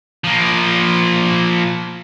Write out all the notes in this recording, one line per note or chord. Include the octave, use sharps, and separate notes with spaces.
F3 A#3